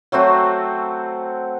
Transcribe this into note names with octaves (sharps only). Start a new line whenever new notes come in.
F#3 A3 C4 F#4